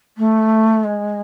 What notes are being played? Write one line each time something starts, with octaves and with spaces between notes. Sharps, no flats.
A3
G#3